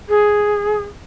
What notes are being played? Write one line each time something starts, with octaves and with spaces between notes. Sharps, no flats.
G#4